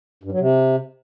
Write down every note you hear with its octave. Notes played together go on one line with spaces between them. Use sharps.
G2
F#3
C3